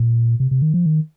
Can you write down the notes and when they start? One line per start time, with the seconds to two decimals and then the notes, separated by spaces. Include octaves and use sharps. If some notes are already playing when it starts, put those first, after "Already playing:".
Already playing: A#2
0.40 C3
0.51 C3
0.62 D#3
0.74 F3
0.86 D#3